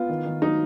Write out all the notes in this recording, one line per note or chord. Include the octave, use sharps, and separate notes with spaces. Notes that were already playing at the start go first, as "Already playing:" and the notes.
Already playing: B3 F4
D#3
D#3
F#3 D#4